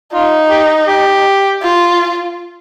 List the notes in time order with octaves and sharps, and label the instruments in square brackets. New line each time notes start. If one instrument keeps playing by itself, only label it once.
[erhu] D#4 [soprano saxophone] F4
[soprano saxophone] G4
G4
[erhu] F4